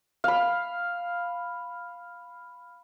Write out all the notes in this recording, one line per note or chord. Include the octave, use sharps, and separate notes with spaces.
F5 B5